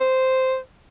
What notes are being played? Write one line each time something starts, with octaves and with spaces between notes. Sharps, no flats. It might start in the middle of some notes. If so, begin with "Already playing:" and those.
C5